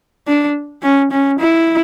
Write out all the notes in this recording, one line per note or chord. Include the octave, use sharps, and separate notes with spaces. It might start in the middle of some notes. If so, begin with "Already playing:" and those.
D4
C#4
C#4
E4